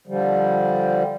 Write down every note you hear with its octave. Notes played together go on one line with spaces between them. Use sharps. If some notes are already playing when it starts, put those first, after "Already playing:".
D3 F3 G3